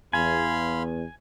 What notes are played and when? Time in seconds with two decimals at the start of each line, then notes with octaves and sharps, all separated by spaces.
0.13 E2 F5 G#5 B5 C6